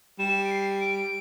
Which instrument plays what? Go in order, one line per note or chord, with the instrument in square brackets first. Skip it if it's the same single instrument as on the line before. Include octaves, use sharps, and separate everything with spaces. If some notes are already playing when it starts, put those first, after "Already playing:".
[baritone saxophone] G3 [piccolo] E7
[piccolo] D7
C7
D7